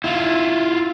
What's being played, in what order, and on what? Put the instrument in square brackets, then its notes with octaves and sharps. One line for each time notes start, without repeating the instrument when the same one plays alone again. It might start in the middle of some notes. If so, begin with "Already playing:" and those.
[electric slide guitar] E4 F4